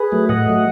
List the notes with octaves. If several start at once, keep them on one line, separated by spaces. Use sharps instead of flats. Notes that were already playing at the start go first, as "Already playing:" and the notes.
Already playing: G#4 B4
F#3 A3
A2 D#5 F#5
F#3 A3